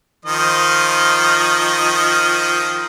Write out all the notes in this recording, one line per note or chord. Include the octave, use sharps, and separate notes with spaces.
D#3 F3 D#5